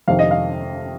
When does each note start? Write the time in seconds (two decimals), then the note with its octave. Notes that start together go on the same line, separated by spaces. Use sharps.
0.08 F2 C3 D#3 F5
0.19 D#5
0.31 F5